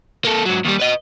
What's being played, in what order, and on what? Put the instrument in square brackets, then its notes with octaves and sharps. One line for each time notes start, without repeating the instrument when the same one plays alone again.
[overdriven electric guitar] A#3 A4
G#2 F#3
D#2 G3
B4 D#5